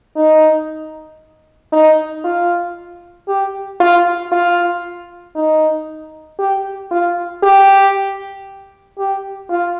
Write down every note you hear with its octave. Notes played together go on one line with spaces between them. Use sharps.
D#4
D#4
F4
G4
F4
F4
D#4
G4
F4
G4
G4
F4